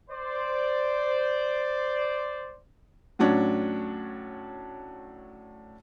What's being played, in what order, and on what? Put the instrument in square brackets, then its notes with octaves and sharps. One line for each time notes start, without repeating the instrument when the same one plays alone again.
[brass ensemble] C5 D5
[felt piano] A2 F#3 C#4 D4